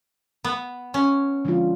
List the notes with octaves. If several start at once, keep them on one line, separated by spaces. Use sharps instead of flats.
B3
C#4
D3 F3 G#3 D4 F4